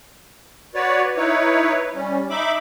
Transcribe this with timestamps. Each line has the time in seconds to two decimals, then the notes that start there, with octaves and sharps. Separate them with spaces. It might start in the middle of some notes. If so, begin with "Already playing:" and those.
0.75 F#4 B4 C#5 D5
1.16 D#4 E4 B4 C#5
1.94 G3 C#4
2.30 D#4 E5 B5 D6